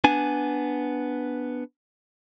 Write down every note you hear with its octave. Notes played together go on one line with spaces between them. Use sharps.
B3 D4 G#5